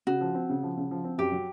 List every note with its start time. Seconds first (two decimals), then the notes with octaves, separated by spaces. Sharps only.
0.07 C#3 F#4
0.21 F3
0.35 C4
0.50 C#3
0.63 F3
0.77 C#3
0.91 F3
1.04 C4
1.18 F#2 G4
1.32 F#3